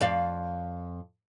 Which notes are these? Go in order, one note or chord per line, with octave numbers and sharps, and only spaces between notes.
F2 D5 F5